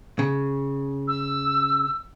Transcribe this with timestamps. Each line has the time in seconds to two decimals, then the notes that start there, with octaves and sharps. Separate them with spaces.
0.19 C#3
1.08 E6